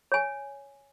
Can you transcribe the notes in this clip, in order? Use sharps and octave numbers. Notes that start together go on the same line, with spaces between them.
C#5 G#5